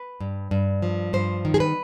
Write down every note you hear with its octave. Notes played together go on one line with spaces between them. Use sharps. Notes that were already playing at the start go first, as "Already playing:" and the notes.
Already playing: B4
G2
G2
F3
G2 C5
D#3
G#4
B4